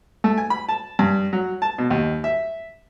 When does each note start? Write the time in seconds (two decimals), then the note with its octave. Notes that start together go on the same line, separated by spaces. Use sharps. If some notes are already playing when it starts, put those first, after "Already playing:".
0.24 A3
0.38 G#5
0.50 B5
0.69 A5
0.99 G2
1.33 F#3
1.62 A5
1.78 B2
1.90 D#2
2.24 E5